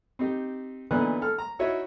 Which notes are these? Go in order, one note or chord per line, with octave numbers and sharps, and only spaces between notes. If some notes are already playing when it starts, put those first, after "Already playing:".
C4 D#4 G4
A#2 D3 E3 B3 D#4 F#6
A4 F6
A#5
D#4 E4 F#4 C#5 D#5 E5